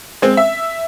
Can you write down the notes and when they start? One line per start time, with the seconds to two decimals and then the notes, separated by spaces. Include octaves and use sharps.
0.22 G#3 C4
0.37 E5